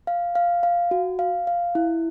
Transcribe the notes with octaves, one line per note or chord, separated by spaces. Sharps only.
F5
F5
F5
F#4
F5
F5
E4